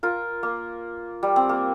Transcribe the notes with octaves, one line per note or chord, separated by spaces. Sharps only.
F4 A#4
A#3
G3
C4
A#3